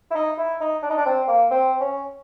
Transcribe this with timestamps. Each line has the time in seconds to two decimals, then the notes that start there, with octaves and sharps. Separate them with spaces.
0.11 E4
0.15 D#4
0.38 E4
0.61 D#4
0.83 D4
0.90 D#4
0.98 D4
1.06 C4
1.28 A#3
1.51 C4
1.81 C#4